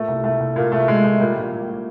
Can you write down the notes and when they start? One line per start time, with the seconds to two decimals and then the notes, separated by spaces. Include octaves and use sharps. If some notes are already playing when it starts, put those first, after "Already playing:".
Already playing: A#2 A3
0.08 C2
0.24 C2 A3
0.40 C2
0.56 A#2 A#3
0.72 C2 A3
0.88 A#2 G#3
1.04 A#2 A3
1.20 A#2 G3 A#3
1.36 A#1
1.52 A#2
1.68 A#2